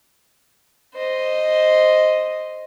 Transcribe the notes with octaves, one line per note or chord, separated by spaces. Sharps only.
C5 D#5